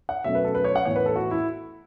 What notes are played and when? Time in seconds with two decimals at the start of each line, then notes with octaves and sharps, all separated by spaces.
0.09 F#5
0.24 B2 F#3 A3 C#4 E5
0.35 B4
0.45 A4
0.55 B4
0.64 C#5
0.76 F#5
0.85 A2 E3 B3 C#5
0.96 B4
1.06 A4
1.16 F#4
1.31 E4